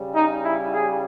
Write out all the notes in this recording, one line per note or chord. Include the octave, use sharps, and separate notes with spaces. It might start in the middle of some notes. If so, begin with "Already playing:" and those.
Already playing: C#3 G3
D#4
E4
G#4